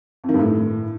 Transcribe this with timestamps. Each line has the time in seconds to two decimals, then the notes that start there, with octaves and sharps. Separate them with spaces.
0.24 F2
0.29 D#3
0.34 G2
0.39 A2